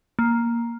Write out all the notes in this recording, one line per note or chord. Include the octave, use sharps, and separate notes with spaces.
A#3